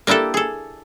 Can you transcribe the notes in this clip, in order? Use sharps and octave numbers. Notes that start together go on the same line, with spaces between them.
A#3 D4 E4 G4 A4
G#4 A4